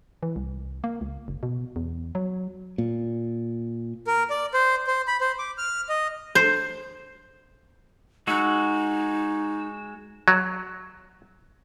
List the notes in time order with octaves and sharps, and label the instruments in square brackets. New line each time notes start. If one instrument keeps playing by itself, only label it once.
[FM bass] E3
C2
A#3
C#2
F#1
B2
E2
F#3
[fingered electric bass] A#2
[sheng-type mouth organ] A#4
D5
C5
C5
B5
C5
D6
F6
D#5
[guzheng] C5
[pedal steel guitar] G#3 F#4 E6 [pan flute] D#4
[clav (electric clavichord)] F#3